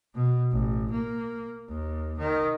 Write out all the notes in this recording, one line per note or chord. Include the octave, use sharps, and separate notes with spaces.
B2
A1
A#3
D#2
D#3